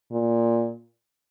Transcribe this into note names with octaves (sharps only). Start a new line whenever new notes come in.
A#2